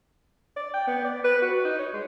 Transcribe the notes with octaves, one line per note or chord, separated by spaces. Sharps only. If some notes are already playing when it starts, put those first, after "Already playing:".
D5
G5
B3
D5
B4
F#4
D#4
C#5
G#3